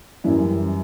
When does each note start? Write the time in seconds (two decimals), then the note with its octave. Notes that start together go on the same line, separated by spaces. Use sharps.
0.24 F#2 E3 G3 E4